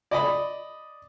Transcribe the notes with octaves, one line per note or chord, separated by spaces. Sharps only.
D5 D#5 B5